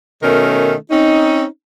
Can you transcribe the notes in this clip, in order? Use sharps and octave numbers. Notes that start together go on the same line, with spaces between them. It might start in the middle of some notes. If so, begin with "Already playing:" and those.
B2 D#3 A3 C#4 A#4
C4 C#4 D#4